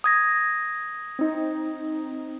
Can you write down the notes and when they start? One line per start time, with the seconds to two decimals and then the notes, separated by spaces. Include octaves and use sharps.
0.04 D#6 G#6 A#6
1.19 C4 D#4